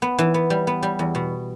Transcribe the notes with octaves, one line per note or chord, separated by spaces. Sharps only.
B3
E3
B3
G3
B3
G3
E2
B2